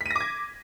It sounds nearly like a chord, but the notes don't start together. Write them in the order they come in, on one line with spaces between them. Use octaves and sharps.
B6 D#7 A#6 D6 G#6